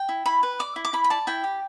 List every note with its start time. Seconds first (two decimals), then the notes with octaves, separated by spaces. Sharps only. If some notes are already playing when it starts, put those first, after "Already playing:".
Already playing: G5
0.09 E4
0.26 E4 B5
0.43 B4
0.59 D5 D6
0.76 E4
0.85 D6
0.93 E4 B5
1.04 B5
1.10 D5 A5
1.27 E4 G5
1.44 G4